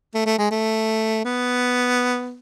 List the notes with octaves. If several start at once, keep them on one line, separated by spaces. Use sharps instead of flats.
A3
A3
G#3
A3
B3